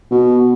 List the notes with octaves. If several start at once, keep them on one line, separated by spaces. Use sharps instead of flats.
B2